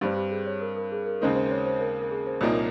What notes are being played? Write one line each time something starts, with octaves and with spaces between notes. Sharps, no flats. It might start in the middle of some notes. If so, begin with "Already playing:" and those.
G2 G3 C4 G4
G4
G#4
C#5
A#4
A#4
G#4
A#4
D#2 C#3 G#3 C4 D#4 A#4
C5
C5
C#5
C5
A#4
A#4
G#4
C5
C2 A#2 F3 A#3 D#4 C#5